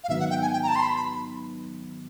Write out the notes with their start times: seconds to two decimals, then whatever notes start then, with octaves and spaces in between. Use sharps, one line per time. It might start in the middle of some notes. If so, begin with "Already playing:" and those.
0.04 F5
0.09 G#2 D#3 F#3 B3 D#4 E5
0.20 F#5
0.30 G5
0.42 G#5
0.53 G5
0.63 A#5
0.68 A5
0.76 C6
0.82 B5
0.96 B5